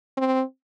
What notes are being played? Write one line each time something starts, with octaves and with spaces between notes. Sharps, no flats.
C4